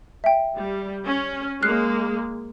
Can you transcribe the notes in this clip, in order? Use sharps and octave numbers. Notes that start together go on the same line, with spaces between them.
E5 G5
G3
C#4
G#3 A#3 F6 F#6 C7